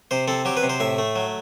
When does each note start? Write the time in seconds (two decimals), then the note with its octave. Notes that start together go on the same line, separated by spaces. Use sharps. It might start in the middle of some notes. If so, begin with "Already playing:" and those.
0.11 C3 C5
0.28 C4 A4
0.45 F#3 G4
0.57 B4
0.63 C3
0.69 C5
0.80 A2 E5
0.98 A3
1.16 F#3